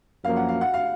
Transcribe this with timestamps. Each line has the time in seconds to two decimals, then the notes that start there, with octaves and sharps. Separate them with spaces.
0.24 F#2 F3 A#3 F5
0.36 F#5
0.49 F5
0.61 F#5
0.74 F5